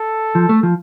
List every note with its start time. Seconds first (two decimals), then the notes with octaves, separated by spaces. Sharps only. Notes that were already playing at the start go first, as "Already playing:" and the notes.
Already playing: A4
0.35 F3
0.49 A3
0.63 F3